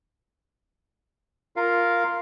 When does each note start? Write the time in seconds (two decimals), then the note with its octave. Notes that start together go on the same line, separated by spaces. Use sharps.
1.56 F4 A#4 F5